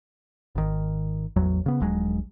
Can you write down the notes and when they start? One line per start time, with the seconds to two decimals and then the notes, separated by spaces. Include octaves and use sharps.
0.55 G#1 D#3
1.36 A1 E2 F#3
1.66 C#3 B3
1.80 D#1 A#1 F#3 G#3